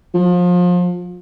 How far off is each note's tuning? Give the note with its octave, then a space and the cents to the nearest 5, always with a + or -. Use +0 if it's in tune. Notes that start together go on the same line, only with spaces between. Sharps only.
F3 +30